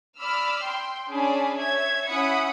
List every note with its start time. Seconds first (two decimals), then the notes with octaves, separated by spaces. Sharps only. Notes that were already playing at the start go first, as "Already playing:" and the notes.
0.18 D5 B5 E6 F6
0.63 G5 C6
1.09 C#4 D4 G#4 D5 A5 B5
1.56 C#5 E5 G#6
2.08 C#4 E4 F#5 B5 D#6 C#7